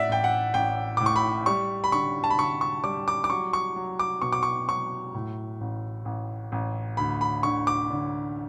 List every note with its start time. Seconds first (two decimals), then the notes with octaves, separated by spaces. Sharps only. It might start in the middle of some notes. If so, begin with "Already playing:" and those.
Already playing: A2 D5 E5 F#5
0.09 A1 G5
0.24 F#5
0.54 A1 G5
0.97 A2 D6
1.06 C#6
1.16 B5
1.46 G3 C#6
1.84 B5
1.92 D3 C#6
2.24 A5
2.30 B5
2.38 D3 C#6
2.61 C#6
2.84 G3 D6
3.08 D6
3.24 D6
3.30 F#3 C#6
3.53 C#6
3.76 F#3
3.99 D6
4.22 B2 C#6
4.32 D6
4.43 C#6
4.68 F#3 C#6
5.14 A2
5.61 A1
6.05 A1
6.52 A1
6.97 D2 B5
7.21 B5
7.43 D3 C#6
7.67 D6
7.90 D3